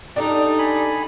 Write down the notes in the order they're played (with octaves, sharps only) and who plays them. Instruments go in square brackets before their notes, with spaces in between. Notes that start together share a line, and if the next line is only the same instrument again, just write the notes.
[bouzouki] D4 G4 A4 [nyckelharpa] D#4 [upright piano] D5
[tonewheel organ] G#5 B5